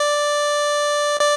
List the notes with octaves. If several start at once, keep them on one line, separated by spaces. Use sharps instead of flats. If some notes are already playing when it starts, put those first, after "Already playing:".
Already playing: D5
D5